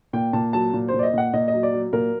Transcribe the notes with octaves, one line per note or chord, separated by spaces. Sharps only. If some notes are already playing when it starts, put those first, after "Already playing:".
A#2 G5
A#2 A5
F#3 A5
A#2
C5
A#2
D5
D#5
A#2 F#5
A#2 D#5
D#5
F#3
D5
F#3
A#2 A#4